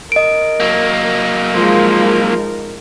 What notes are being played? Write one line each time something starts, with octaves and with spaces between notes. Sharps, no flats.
A#4 D#5 D7
F#3 A#3
F3 G#3 D#4 A#4